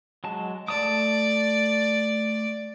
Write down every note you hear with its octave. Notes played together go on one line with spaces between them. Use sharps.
F#3 G#3 A5
A3 D5 A5 D#6